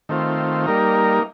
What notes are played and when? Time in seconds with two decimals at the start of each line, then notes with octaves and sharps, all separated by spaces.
0.09 D#3 A3 C4 F4
0.66 G3 A#3 D#4 A#4